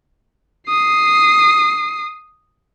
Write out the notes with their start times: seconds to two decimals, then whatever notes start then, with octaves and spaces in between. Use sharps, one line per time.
0.69 D#6 C7